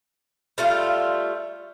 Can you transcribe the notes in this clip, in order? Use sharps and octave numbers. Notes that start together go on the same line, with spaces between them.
G3 A3 F4